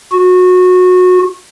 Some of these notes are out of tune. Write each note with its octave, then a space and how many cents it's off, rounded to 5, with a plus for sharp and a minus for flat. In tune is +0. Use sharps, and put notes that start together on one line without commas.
F#4 -25